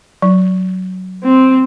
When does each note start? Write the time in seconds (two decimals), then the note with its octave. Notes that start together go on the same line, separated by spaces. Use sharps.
0.22 F#3
1.24 C4